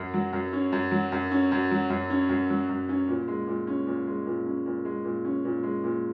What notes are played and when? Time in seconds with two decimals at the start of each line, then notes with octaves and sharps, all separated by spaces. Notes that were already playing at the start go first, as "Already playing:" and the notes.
Already playing: F#2
0.14 F#3
0.33 F#2
0.53 C#4
0.72 F#2
0.92 F#3
1.12 F#2
1.31 C#4
1.52 F#2
1.71 F#3
1.90 F#2
2.10 C#4
2.29 F#2
2.50 F#3
2.69 F#2
2.89 C#4
3.08 A#2
3.28 G#3
3.47 A#2
3.67 C#4
3.87 A#2
4.07 G#3
4.26 A#2
4.45 C#4
4.66 A#2
4.85 G#3
5.05 A#2
5.25 C#4
5.45 A#2
5.63 G#3
5.84 A#2